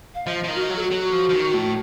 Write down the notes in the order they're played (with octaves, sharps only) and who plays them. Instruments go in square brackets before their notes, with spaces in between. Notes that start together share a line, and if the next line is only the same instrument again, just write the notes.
[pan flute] F5
[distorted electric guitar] F3 [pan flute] D#5
[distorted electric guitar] F3
D#3
[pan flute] F#4
[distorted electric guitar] F#3
[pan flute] A4
F#4
[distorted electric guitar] F#3
F3
F3
D#3
A2